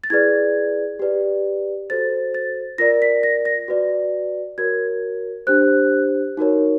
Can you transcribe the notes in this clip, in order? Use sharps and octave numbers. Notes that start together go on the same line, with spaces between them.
A6
E4 G#4 B4 D5 G#6
G4 B4 D5
F#4 A4 C5 A6
A6
F4 A#4 D5 A#6
B6
A#6
A#6
F#4 B4 D5
F#4 A#4 C#5 G#6
D4 G4 C5 F#6
D#4 F#4 A#4 C#5